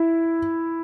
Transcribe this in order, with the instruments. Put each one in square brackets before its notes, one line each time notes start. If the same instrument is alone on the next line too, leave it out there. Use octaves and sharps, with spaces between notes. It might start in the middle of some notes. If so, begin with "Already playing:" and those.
Already playing: [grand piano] E4